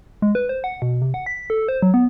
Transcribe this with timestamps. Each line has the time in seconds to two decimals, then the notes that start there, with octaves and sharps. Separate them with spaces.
0.22 G#3
0.35 B4
0.49 C5
0.64 F#5
0.82 B2
1.02 C3
1.14 F#5
1.26 B6
1.50 A4
1.68 C5
1.82 F#3
1.94 B3